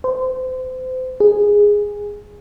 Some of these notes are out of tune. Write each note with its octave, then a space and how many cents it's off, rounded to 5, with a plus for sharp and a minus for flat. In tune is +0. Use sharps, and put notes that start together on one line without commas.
C5 -30
G#4 -10